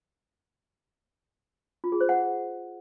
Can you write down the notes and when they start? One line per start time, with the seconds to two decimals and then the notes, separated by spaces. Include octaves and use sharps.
1.84 F4
1.92 G#4
2.01 C5
2.09 F#5